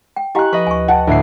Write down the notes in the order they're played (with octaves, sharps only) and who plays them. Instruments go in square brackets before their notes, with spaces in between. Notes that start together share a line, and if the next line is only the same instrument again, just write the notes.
[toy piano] G5
[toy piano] E4 G4 F5 [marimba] D#5 G#5 A#5 [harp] C#6 F#6
[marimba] F3 [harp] B4 D#5 [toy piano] C#6
[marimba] D2 [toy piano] G#5 C#6
[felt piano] F#5 A5 [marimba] G5
[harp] D2 A2 C7